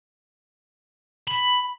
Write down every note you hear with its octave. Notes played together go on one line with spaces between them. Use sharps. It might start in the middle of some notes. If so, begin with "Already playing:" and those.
B5